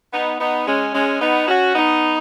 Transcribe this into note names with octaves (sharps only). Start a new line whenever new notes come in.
B3 D#4
B3 D#4
G#3 C#4
G#3 C#4
B3 D#4
C#4 F#4
B3 D#4